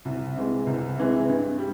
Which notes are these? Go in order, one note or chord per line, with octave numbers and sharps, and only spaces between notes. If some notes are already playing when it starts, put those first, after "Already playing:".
C2
C3 E3 G#3
C2
C3 E3 G#3
G2
G3